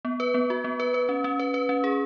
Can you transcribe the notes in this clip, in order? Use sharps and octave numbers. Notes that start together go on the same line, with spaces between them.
B3
B4
B3
F#4
B3
B4
B4
C#4
C#4
B4
B4
C#4
G#4